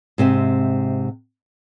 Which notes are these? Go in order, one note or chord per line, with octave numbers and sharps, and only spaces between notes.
G#2 C3 C4 E5